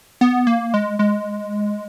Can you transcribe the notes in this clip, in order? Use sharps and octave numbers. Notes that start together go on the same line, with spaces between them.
B3
A#3
G#3
G#3